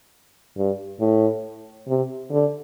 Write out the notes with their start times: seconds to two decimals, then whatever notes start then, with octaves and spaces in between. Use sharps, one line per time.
0.57 G2
1.00 A2
1.88 C3
2.31 D3